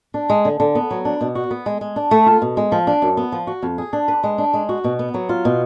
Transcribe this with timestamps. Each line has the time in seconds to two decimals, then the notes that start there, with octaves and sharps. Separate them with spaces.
0.14 D4
0.30 G#3
0.45 D3
0.60 D3
0.75 B3
0.91 F#3
1.05 D4
1.21 B2
1.35 F#4
1.51 B3
1.66 G#3
1.81 G#3
1.96 D4
2.11 A3
2.26 F4
2.42 B2
2.57 G#3
2.72 F3
2.87 D4
3.02 F#2
3.17 B3
3.32 F3
3.47 F#4
3.63 F2
3.78 G#4
3.93 D4
4.08 B4
4.24 G#3
4.38 D4
4.54 G#3
4.69 F#4
4.84 B2
4.99 B3
5.14 F#3
5.29 F4
5.45 B2